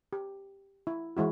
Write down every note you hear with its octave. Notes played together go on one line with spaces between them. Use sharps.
G4
E4
E3 G#3 E4 F#4